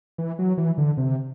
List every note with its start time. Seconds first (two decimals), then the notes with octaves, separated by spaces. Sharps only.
0.18 E3
0.39 F#3
0.58 E3
0.78 D3
0.97 C3